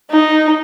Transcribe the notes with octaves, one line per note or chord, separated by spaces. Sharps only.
D#4